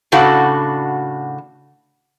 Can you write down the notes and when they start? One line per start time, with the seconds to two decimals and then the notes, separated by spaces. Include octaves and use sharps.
0.12 A2 C#3 D4 F#4 A4 F#5